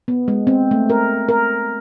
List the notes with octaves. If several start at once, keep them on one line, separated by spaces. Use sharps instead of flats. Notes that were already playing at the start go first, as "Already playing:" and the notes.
B3
G#3
C4
A3
A#4
A#4